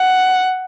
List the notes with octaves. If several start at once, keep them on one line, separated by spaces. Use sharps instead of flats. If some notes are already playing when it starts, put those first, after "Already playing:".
Already playing: F#5